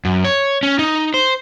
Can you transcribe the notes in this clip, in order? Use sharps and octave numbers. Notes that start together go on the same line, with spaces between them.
F#2
C#5
C#4
D#4
C5